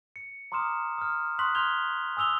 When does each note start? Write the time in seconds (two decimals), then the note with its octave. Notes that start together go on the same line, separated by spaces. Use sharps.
0.16 C#7
0.52 A#5 C6 D6 D#6 F6 E7
0.98 D#6 F6
1.38 C6 C#6 D#6 F#6 B6 F#7
1.55 C6 F6 G6 G#6 F7 G7
2.17 G#5 D#6 E6 F7 G7